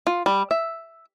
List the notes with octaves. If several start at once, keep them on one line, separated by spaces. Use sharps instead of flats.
F4
G3
E5